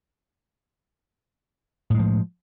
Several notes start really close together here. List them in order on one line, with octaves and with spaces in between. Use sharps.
A2 G#3 F3